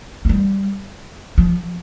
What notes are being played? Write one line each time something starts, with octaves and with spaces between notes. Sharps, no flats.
A3
G3
F3